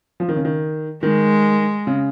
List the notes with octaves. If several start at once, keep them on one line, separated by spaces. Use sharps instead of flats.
F3
D#3
C#3
D#3
D#3 G#3
C#3